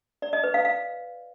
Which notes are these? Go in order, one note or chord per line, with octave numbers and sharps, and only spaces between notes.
D5
D#5
B4
F5
F5